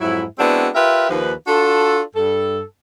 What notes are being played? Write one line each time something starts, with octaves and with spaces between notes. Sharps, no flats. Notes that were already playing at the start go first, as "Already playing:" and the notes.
F2 G#2 F#3 E4
G#3 B3 C4 D4 E4 F#4
F4 G4 A#4 B4 E5
D#2 F3 B4
D4 F4 F#4 A4
G2 A4